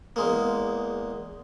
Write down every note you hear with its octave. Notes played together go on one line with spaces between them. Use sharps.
E2 G#3 A#3